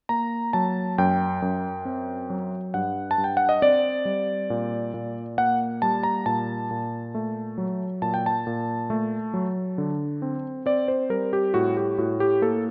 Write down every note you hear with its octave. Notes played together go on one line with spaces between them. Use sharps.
A#3 A#5
F#3 A5
F#2 G5
F#2
C4
F#3
G2 F#5
A5
G2
G5
F#5
D#5
C4 D5
G3
A#2
A#2
A#3 F#5
G3 A5
A#5
A#2 A5
A#2
A3
F#3
A#2 A5
G5
A5
A#2
A3
F#3
D3
C4
C4 D5
C5
G3 A#4
G4
A2 F#4
G4
A2 F#4
G4
A#3 A4